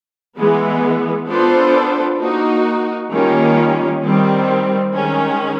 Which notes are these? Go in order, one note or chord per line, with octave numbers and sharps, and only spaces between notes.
E3 G#3 B3
B3 D4 F4 A4 C5
A#3 D#4 F#4
D#3 G3 A#3 C#4 F4
D#3 G3 C4
D#3 G#3 C#4